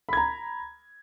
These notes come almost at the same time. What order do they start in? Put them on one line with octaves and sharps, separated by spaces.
B5 G#6 A#5